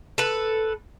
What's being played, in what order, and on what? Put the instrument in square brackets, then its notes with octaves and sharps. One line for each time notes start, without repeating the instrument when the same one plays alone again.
[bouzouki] A4 B4